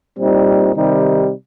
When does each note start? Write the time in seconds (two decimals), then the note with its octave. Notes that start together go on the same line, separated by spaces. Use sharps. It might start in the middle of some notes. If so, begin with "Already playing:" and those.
0.17 A#2 G3 C4 D#4
0.74 C3 D#3 G3 D#4